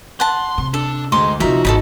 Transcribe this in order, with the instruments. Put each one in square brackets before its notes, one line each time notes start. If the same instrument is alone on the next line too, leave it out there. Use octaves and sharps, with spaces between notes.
[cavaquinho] F#5 A5 [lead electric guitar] C6
[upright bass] C3
[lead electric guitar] D4 [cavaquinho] A4
[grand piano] D2 [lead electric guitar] G#3 [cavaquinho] D#4 C6 D6
[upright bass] D#2 C3 [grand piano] F3 D#4 [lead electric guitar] F#4 [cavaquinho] A#4 E5
[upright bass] G#1 E2 [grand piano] D#4 D#5 [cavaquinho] A4 A5 B5